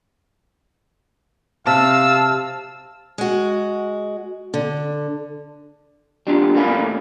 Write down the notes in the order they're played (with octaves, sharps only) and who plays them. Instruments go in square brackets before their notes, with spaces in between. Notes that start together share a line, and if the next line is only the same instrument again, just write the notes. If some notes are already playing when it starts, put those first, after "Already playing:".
[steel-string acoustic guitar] C3 [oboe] F5 [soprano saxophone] A5 [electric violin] E6
[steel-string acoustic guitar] G#3 F#4
D3
[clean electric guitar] G3 D4 F4
A2 A3 A#3 C#4 F5 B5